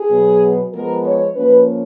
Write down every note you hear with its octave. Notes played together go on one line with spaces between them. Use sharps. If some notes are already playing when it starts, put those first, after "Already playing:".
Already playing: G#4
B2 F#3 B3
F3 G#3 B3 A#4
C#5
F3 A#3 C#4 B4